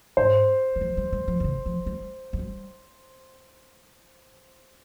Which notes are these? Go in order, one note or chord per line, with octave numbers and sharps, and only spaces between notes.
G#2 C5
D#3
F3
G3
G3
F3
C#3
D#3
F3
G3
F3
G3